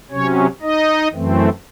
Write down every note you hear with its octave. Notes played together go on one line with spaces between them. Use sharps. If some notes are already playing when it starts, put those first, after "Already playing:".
C3 F#3 C#4 C#5
D#4 D#5
F#2 E3 A3 C4